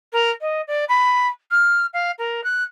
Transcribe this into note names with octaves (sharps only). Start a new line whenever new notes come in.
A#4
D#5
D5
B5
F6
F5
A#4
F#6